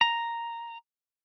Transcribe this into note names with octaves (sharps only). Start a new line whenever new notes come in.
A#5